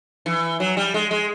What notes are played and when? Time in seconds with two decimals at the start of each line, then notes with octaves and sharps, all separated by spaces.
0.26 E3
0.60 F#3
0.77 G3
0.94 G#3
1.11 G#3